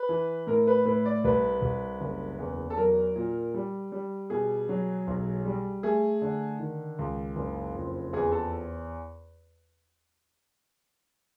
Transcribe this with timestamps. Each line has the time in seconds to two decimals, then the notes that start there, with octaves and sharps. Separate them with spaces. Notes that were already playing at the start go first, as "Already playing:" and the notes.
Already playing: B4
0.09 E3
0.47 A2 A#4
0.67 B4
0.85 A2 B4
1.05 D5
1.24 C2 B4
1.62 C2
2.01 F#1
2.39 E2
2.70 A4
2.77 F#3 A#4
3.16 A#2
3.54 G3
3.92 G3
4.30 B2 G#4
4.69 F#3
5.07 B1
5.45 G3
5.83 A3 G#4
6.22 D3
6.60 D#3
6.99 C#2
7.36 F#1
7.75 F2
8.13 E2 G#4
8.32 A4